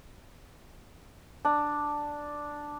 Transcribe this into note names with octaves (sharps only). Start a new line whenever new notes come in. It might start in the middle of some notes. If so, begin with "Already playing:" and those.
D4